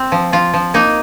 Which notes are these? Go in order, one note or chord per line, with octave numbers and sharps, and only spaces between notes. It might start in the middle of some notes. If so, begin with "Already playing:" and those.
Already playing: C4
F3
F3 F4
F3
A#3 D#4